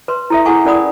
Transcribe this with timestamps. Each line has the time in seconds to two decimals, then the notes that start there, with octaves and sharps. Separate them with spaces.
0.08 B4 C6
0.30 E4 A4 E5
0.45 E4 G#4 A4 F#5 G#5 C#6
0.65 C#4 A#4 D5 F#5 B5 D#6